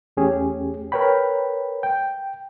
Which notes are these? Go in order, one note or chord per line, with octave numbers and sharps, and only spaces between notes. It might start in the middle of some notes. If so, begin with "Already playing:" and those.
E2 A3 C#4 G4 G#4
A#4 B4 C#5 G5 B5
G5